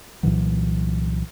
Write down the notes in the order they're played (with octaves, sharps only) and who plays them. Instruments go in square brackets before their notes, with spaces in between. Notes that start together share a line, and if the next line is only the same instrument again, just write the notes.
[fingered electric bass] C2 A#2 E3 F#3